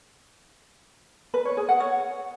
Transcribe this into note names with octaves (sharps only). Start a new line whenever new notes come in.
B4
C#5
G#4
F#5
C#5